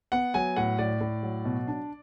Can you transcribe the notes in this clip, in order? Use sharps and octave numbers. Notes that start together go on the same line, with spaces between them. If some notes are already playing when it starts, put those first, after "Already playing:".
B3 F#5
F#3 G#5
A2 F#5
A2 D5
A2
F#3
B2
D4